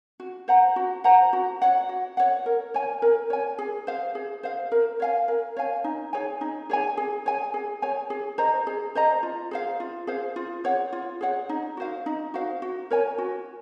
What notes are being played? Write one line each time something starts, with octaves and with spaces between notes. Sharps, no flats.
F#4
C5 F#5 A#5
F#4
C5 F#5 A#5
F#4
C#5 F#5
F#4
C#5 F#5
A#4
C#5 G#5
A#4
C#5 G#5
G#4
C5 F5
G#4
C5 F5
A#4
C#5 F5 G#5
A#4
C#5 F5 G#5
D#4
G#4 C#5 G#5
D#4
G#4 C#5 G#5
G#4
C#5 G#5
G#4
C#5 G#5
G#4
C5 D#5 A#5
G#4
C5 D#5 A#5
F4
G#4 C5 F5
F4
G#4 C5 F5
F4
G#4 C#5 F#5
F4
G#4 C#5 F#5
D#4
F#4 C5 F5
D#4
F#4 C5 F5
F#4
A#4 C#5 G#5
F#4